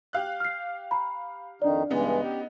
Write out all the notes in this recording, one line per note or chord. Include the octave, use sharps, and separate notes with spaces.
G4 F5 F#6
F6 C7
A#5 B5
F2 D#3 D4 D#4 D5
G2 C#3 E3 G#3 B3 D#4
G4